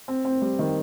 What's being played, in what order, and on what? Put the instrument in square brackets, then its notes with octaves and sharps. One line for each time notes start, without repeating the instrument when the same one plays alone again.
[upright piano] C4
C4
G3
D#3